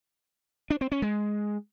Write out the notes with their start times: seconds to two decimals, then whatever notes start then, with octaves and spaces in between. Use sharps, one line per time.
0.70 D4
0.81 C4
0.92 C#4
1.02 G#3